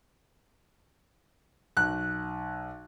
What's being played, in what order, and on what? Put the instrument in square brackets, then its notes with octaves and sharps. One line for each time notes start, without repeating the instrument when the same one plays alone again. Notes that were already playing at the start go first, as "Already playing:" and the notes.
[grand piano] B1 [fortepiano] F#6